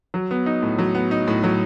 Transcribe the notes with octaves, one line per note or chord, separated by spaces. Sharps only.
F#3
B3
D#4
A2
F#3
B3
D#4
A2
F#3